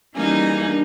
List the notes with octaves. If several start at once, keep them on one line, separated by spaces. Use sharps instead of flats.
E3 G3 A#3 C#4 D#4 G#4
D4